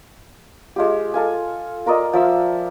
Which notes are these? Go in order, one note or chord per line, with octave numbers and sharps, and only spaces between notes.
G#3 F4 G4
A4 F5 G#5
F4 A#4 D5 D#5
F3 E5 E6